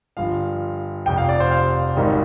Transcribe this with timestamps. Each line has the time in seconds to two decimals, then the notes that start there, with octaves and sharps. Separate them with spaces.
0.17 G1 G2 F3 F5
1.06 F1 F2 C3 G5
1.17 F5
1.29 D5
1.40 C5
1.51 F5
1.96 G#1 G#2 D#3 G3